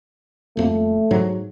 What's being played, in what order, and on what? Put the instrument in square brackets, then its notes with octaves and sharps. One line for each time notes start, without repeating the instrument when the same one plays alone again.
[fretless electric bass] D#1 F2 A#3 [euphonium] A3
[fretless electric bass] G#2 F#3